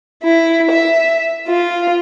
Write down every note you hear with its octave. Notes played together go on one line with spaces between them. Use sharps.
E4
E5
F4